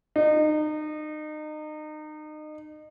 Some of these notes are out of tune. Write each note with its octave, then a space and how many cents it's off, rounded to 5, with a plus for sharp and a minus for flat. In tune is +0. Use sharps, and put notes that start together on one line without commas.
D#4 -30